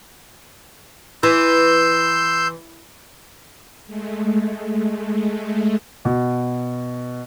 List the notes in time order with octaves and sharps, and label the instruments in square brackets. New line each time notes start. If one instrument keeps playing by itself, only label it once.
[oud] E3 [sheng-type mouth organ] C6 E6 G6
[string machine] G#3 A3
[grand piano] B2